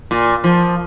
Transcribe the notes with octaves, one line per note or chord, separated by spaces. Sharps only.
A#2
F3